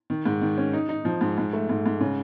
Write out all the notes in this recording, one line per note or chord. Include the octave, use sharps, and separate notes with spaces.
D#3
G#2
D#3
C#4
D#4
D#4
F3
G#2
G#2
A3
G#2
G#2
C#3